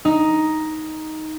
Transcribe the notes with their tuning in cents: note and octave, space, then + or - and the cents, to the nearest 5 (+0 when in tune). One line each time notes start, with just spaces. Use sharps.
D#4 +5